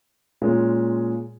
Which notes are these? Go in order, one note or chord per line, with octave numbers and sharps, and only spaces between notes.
A#2 G#3 C#4 F4 G#4